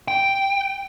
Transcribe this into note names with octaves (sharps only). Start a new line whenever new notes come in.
G5